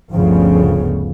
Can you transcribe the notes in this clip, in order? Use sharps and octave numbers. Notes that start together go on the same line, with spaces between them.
G1 D2 G2 C#3 F3 B3